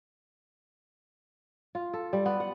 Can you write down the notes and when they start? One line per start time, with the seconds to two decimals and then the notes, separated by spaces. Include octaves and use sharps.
1.75 F4
1.93 A4
2.13 G3
2.26 B3
2.40 F#5